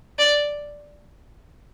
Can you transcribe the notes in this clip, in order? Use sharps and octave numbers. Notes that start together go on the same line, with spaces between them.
D5